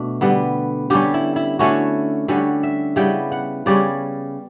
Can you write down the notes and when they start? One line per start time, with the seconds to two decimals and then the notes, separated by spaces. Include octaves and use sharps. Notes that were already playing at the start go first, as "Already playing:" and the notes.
Already playing: B2 A3 D4
0.21 D3 G3 B3
0.90 D3 G3 C#4 G4
1.14 E4
1.36 E4
1.59 D3 A3 C#4 E4 F#4
2.28 D3 G3 C#4 F#4
2.63 E5
2.96 C#3 G3 B3 E4 G5
3.32 F#5
3.66 C#3 G3 C#4 D5